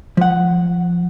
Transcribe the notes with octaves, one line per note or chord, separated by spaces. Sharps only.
F3 F#5